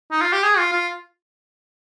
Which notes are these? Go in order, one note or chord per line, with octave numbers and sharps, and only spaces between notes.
D#4
F4
G4
G#4
F4
F4